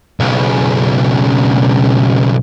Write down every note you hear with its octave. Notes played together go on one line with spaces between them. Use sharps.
B1 C#3